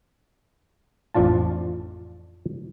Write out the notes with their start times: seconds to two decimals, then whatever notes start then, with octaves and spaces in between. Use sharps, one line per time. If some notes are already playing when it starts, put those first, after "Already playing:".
1.14 A1 F2 F3 D4 F4 A5